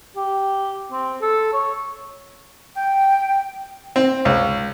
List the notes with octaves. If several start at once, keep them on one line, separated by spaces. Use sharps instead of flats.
G4
C4
A4
C#5
G5
C4
C#2